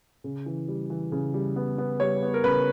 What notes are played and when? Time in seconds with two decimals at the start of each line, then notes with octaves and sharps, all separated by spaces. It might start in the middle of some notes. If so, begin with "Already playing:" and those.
0.24 C#3
0.46 E3
0.68 G3
0.90 E3
1.12 C#3
1.34 G3
1.56 B3
1.78 B3
2.00 G3 C#5
2.22 B3
2.34 A#4
2.44 C#3 B4